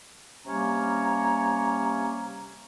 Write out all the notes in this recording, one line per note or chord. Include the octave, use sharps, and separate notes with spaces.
C3 G3 A#3 C#4 C#5 A#5